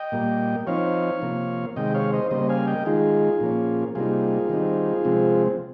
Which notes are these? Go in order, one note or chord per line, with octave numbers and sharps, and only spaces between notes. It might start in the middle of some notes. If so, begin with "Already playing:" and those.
Already playing: D#5 G5
A#2 G3 A#3
F3 C4 D#4 C#5 F5
C3 F3 A#3
C3 D#3 G#3 D#5 G5
C#5 F5
C5 D#5
C#3 G3 A#3 C5 D#5
F5 G#5
D#5 G5
D#3 G#3 D#4 F4 G#4
A#2 F3 A#3 C#4
C3 G3 A#3 D#4 F4 G#4
D#3 G3 C4 D#4
C3 F3 G#3 C4